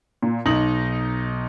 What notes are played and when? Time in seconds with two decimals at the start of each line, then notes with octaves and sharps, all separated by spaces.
0.22 A#2
0.46 B1 D#4 F#7